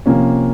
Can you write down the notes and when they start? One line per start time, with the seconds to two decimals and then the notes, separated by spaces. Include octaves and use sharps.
0.06 C3 F3 A#3 C#4